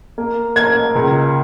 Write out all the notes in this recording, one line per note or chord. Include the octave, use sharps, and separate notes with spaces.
A#3
A#3 G#6
C#2